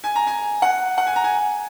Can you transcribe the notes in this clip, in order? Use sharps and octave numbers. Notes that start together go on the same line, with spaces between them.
G#5
A#5
G#5
F#5
F#5
G#5
A#5
G#5